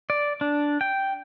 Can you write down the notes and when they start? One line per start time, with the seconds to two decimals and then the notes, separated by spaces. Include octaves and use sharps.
0.10 D5
0.41 D4
0.81 G5